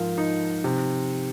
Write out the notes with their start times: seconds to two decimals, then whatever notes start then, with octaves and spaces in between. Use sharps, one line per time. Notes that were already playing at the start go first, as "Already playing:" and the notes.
Already playing: G#2 F3 A#4
0.18 D#4
0.64 C3